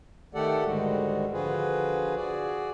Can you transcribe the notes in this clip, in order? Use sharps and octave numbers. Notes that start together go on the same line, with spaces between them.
D#3 A3 G4 A4 D5 F#5
G#2 D3 D#3 G3 G#3 F#4
D3 F3 F4 F#4 G#4 B4
F#4 G#4 D5